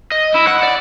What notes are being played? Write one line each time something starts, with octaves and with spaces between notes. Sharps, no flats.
D#5
E4
F#5
D5